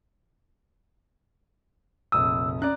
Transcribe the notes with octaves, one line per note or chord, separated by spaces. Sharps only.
F1 A#1 D#6 E6
C#4 D5 A#5 F#6